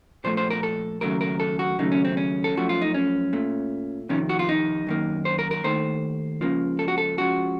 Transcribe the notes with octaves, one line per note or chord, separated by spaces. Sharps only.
A#2 F3 A3 C5
C5
A#4
A4
D#2 C#3 F#3 A3 A#4
A#4
A4
F#4
D#2 C#3 F#3 A3 D#4
C#4
C4
C#4
A4
F#2 F3 A3 F#4
F4
D#4
C#4
A#2 A3
F2 C3 D#3 C#4
F#4
F4
D#4
F#2 D#3 A#3
C5
A#4
A#4
D#2 D#3 A3 C5
C#2 C#3 F3 A#3
A4
F#4
A4
C#2 C#3 F3 F#4